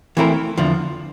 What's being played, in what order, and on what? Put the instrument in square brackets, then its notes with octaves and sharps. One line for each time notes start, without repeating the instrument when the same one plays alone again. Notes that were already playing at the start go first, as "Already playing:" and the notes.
[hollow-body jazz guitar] E3 A3 C4 E4 A#4
E2 D3 F3